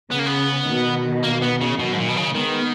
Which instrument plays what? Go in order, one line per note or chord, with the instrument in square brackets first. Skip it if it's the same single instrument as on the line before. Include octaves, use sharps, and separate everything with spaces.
[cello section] C#3 [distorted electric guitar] B3
[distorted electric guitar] A#3
B3
[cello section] B2 D#3
[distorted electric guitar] A#3
B3
C#3
[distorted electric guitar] B2 [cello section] D#3 F#3
[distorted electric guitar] G#2
A#2
B2
C#3
[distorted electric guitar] D#3 [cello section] G#3 B3